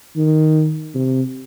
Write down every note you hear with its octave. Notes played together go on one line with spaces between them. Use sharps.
D#3
C3